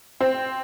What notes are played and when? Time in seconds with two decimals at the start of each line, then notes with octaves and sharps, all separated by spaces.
0.21 C4